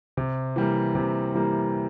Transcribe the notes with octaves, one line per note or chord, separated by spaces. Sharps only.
C3
E3 G3 A#3
C3
E3 G3 A#3